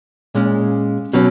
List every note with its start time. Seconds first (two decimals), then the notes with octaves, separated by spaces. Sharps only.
0.35 A#2 G#3 C#4
1.13 B2 F#3 C#4